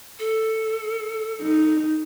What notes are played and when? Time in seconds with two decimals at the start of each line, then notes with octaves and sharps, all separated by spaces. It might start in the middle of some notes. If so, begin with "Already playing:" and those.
0.19 A4
1.42 D#4